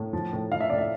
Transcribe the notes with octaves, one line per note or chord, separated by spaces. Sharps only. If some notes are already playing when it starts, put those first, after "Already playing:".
Already playing: A2
F3
A2
F3 F5
E5
A2 D5
E5